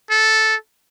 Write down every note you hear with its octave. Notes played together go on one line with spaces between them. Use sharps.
A4